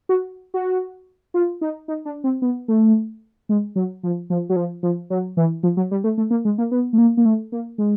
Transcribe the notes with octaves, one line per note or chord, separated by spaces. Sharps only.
F#4
F#4
F4
D#4
D#4
D4
C4
B3
A3
G#3
F#3
F3
F3
F#3
F3
F3
F#3
E3
F3
F#3
G3
A3
A3
A#3
G#3
A#3
B3
A3
A#3
A#3
A3
A#3
G#3